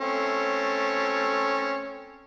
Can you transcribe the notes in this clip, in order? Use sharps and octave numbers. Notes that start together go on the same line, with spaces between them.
A3 C4 C#4